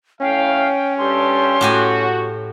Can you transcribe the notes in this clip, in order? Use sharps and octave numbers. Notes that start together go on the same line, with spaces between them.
A2 C#4 F5 G5
G2 G4 A4 C6
A2 F#4 G4 G#5